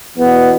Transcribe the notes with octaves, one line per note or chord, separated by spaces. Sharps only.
E2 B2 B3